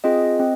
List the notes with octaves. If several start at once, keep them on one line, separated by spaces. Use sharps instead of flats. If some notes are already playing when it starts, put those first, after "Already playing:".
C4 F4 G#4 D#5
C4